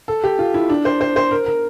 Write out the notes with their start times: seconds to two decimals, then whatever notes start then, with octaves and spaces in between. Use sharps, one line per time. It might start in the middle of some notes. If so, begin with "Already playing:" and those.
0.08 A4
0.24 G4
0.39 F4
0.54 E4
0.69 D4
0.85 C5
1.01 C5
1.16 C5
1.31 A#4
1.46 A#4